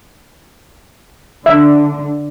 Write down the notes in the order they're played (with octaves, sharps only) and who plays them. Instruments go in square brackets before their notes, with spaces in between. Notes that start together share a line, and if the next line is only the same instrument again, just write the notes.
[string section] D3 [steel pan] E5